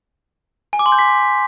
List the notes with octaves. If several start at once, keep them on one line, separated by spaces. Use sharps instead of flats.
G#5
D6
C6
G6
B6